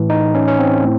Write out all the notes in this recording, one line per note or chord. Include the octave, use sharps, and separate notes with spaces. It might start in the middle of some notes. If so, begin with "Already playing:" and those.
Already playing: A2 E3
D#4
C#4
C#4
C4
A2